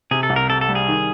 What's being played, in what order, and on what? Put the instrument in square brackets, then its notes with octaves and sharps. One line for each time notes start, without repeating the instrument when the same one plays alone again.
[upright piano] C3 [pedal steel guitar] G#4
[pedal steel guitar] A4
[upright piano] C2
[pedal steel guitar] A#4
[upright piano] C3 [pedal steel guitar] A4
[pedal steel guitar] A4
[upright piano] G3
[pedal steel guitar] G#4
[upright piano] D#3